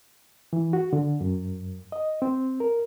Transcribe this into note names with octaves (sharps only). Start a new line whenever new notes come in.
E3
F#4
D3
F#2
D#5
C4
A#4